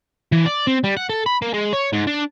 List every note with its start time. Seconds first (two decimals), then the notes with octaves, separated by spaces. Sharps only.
0.32 E3
0.46 D5
0.67 C4
0.84 G3
0.97 F#5
1.09 A4
1.26 B5
1.42 A#3
1.54 G#3
1.73 C#5
1.93 G#2
2.07 D4